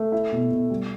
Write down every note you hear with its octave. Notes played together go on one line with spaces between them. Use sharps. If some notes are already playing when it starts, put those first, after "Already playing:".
Already playing: A3
E4
B2
B2
G3